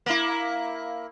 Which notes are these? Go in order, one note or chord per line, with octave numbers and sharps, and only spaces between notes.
A#3 E4